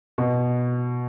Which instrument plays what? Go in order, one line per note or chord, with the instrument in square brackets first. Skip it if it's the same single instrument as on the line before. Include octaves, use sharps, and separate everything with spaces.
[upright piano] B2